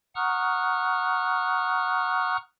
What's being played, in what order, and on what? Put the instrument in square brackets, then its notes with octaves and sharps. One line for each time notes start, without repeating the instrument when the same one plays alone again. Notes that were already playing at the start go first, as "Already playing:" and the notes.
[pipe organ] F#5 A#5 C#6 D#6 F6 F#6